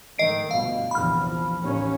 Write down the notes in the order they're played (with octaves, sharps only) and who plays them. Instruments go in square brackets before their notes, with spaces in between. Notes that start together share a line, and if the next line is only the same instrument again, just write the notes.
[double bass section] G#2 D#3 A3 [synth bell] D#5 C7 D7
[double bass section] G1 B2 [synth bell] F5
[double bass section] A#1 E2 C3 [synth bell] B5 F6
[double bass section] F3
A1 D#2 C#4